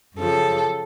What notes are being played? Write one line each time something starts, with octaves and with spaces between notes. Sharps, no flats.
F#2 C#3 F3 A4